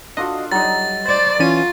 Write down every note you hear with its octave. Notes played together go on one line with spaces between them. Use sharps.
D4 F4 F#4 A4 D#5
F#3 G3 D#4 D#5 A6
C5 D5 A6
E3 C#4 F4 D#7